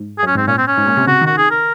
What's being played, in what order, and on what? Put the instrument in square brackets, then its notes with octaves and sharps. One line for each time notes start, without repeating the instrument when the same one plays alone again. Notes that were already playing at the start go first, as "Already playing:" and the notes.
Already playing: [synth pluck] G#2
[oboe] G#4
[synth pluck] F#2 [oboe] C#4
[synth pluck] G#2 [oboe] C4
[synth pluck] A#2 [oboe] C#4
[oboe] C4
C#4
[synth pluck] G#2
A#2
C3
[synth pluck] C#3 [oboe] F#4
[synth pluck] D#3 [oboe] F#4
[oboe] G#4
A#4